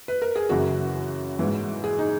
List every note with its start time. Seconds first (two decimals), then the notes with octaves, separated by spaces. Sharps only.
0.08 B4
0.22 A#4
0.36 G#4
0.49 F#2 C#3 E3 F#4
1.39 G#2 E3
1.84 G#4
1.99 D#4